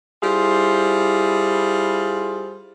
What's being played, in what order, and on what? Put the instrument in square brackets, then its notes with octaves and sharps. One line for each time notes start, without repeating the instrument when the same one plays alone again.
[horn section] G3 E4 F4 G#4 C5